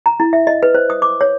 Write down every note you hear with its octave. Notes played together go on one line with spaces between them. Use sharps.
A#5
E4
E5
D#5
B4
C5
D#6
D6
C#5